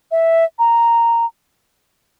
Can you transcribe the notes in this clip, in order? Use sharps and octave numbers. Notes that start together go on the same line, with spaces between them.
E5
A#5